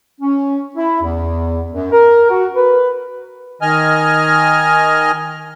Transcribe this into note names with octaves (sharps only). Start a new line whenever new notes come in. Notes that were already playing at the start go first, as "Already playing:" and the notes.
C#4
E4
E2
F#2
A#4
F#4
B4
D#3 D#5 G#5 F6